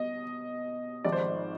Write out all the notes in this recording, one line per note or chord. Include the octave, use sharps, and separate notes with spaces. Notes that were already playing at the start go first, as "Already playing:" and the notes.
Already playing: B2 D#5
G#1 G#2 F3 D5
C5
D5